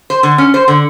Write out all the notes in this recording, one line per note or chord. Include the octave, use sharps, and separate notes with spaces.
C5
D3
C#4
C5
D3